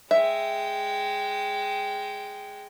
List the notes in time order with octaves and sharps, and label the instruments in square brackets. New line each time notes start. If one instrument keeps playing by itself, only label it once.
[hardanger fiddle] G#3 G5 [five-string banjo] E5